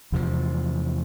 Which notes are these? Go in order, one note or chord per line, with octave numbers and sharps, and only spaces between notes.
E2 C3 F3